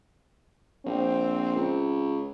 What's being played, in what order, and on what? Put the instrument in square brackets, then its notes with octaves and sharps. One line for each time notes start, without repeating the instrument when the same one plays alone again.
[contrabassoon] A#1 [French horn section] C4
[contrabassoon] C#2